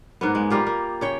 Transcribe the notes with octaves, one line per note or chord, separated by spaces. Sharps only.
G#2 A#3 B3
G#3
G3 A#3 F4 G4
A#3
C#3 C#5 G5